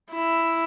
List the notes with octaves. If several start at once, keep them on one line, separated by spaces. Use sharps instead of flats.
E4